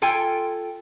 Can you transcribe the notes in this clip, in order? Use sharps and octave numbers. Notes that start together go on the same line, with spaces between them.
F4 A4 G5 G#5